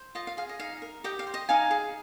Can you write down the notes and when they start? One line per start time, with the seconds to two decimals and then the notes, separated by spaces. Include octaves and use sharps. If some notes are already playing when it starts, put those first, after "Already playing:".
Already playing: C5
0.15 F4 D#5
0.27 F5
0.37 G#4 F5
0.49 D#5
0.60 D#4 F5
0.82 A#4
1.04 G4 D#5 G5
1.19 F5
1.27 C5
1.34 D#5
1.49 D#4 F5 G#5
1.71 G#4